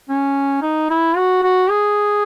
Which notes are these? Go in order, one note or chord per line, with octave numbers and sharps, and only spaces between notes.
C#4
D#4
E4
F#4
F#4
G#4